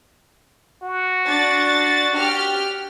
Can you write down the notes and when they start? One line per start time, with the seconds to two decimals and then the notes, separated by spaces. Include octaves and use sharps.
0.82 F#4
1.27 D4 A6
2.17 G4 F6